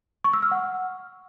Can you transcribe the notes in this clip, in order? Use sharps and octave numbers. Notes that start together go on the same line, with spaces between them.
C#6
E6
F6
F#5